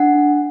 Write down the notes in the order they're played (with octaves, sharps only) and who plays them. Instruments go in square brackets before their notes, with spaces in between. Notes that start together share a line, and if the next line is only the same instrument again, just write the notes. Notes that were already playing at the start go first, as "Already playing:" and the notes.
Already playing: [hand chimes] D4 F#5